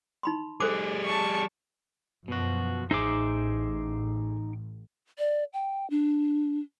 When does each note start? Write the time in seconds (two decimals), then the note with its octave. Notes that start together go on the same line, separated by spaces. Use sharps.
0.23 D#4 B5 C6
0.60 G3 G#4 A4 C5 D6
1.05 A5 C#6
2.28 F#2 B2 F3 F#4
2.91 A1 D#4 G#4 C5 E5 D6
5.18 D5
5.53 G5
5.90 D4